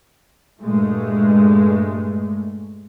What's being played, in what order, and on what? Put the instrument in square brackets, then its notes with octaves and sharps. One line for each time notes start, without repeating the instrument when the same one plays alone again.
[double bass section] G2 A#2 G#3 A3